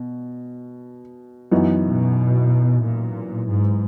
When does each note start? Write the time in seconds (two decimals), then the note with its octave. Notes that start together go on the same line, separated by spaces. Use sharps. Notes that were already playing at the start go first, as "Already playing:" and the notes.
Already playing: B2
1.51 F#2 E3 B3 D#4 F#4
1.84 B2
2.82 A#2
3.47 G#2